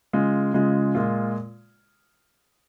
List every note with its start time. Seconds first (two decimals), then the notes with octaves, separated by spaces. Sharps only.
0.13 C#3 G#3 F4
0.54 C#3 G#3 F4
0.95 A#2 G#3 F4